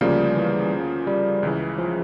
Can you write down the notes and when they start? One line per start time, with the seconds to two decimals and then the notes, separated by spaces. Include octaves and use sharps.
0.01 D2 C#3 F3 G3 A#3
0.37 E3
1.07 G3
1.43 C#2 C#3 E3
1.78 F3